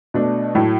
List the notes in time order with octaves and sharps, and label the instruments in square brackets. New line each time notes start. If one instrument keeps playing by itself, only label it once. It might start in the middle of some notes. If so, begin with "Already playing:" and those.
[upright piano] B2 A3 D4
A2 F#3 A3 E4